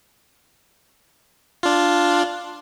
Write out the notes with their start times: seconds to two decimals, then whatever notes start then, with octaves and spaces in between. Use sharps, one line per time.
1.63 D4 F4